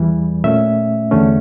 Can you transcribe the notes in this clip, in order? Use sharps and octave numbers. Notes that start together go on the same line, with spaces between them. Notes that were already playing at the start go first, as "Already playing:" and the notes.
Already playing: E2 E3 G3
A#2 A3 C#4 E5
E2 D3 A3 C#4